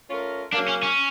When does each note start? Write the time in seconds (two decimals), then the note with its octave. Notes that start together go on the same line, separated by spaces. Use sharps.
0.09 A3 C#4 F4 A#4
0.52 A#3 D4
0.55 C#3 F#3
0.68 C#4
0.83 C#4